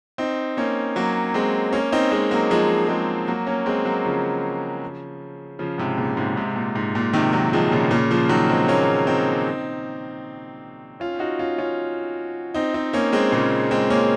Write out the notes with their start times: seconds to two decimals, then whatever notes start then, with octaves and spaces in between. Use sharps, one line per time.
0.18 C4 D#4
0.57 A#3 C#4
0.96 F#3 A#3
1.34 G#3 C4
1.73 A#3 C#4
1.92 C4 D#4
2.12 G#3 C4
2.31 F#3 A#3
2.50 F3 G#3
2.88 G#3 C4
3.27 F#3 A#3
3.47 A#3 C#4
3.66 G#3 C4
3.85 F#3 A#3
4.05 C#3 F3
5.59 C#3 F3
5.78 G#2 C3
5.98 A#2 C#3
6.17 G#2 C3
6.37 G#2 C3
6.56 A#2
6.76 G#2
6.95 A#2
7.13 C3 D#3
7.33 D#3 F#3
7.53 F3 G#3
7.72 A#2 C#3
7.91 A#2 C#3
8.11 C#3 F3
8.29 D#3 F#3
8.49 G#3 C4
8.68 A#3 C#4
9.07 C4 D#4
11.00 C#4 F4
11.19 D#4 F#4
11.39 C#4 F4
11.58 C#4 F4
12.54 C4 D#4
12.74 C4 D#4
12.93 A#3 C#4
13.13 G#3 C4
13.32 A#2 C#3
13.71 G#3 C4
13.90 A#3 C#4